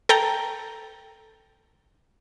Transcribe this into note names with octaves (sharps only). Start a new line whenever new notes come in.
A4 G5 A#5